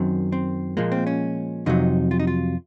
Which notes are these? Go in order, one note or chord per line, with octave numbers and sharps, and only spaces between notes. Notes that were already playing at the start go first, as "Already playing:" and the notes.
Already playing: F#2 D#3 F#3 C4
C4
A#2 F3 G#3 A#3
C4
C#4
F2 C3 F#3 D#4
F4
D#4
F4